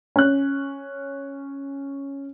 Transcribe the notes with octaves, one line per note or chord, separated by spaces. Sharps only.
C#4 F#6